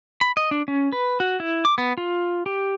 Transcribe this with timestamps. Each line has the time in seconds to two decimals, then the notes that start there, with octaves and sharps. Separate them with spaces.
0.21 B5
0.37 D#5
0.51 D4
0.68 C#4
0.92 B4
1.20 F#4
1.40 E4
1.65 D6
1.78 B3
1.98 F4
2.46 G4